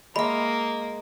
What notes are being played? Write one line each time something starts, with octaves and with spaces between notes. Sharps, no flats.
G#3 A#3 D#5 E5 B5